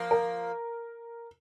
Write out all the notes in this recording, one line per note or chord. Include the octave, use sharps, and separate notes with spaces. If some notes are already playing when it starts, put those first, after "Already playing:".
Already playing: F3 A#3
A#4